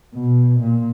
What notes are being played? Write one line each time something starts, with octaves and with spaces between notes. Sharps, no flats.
B2
A#2